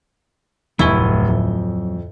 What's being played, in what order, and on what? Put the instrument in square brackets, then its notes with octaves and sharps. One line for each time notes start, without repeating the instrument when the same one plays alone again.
[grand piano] F1 C#6 G7 [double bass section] D2 A2 [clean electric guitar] F#3 G#5 [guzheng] E4
[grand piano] F2